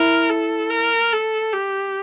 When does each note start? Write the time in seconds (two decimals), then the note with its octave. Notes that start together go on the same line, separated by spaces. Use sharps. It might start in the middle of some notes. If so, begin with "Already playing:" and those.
Already playing: E4 A#4
0.30 A4
0.70 A#4
1.13 A4
1.53 G4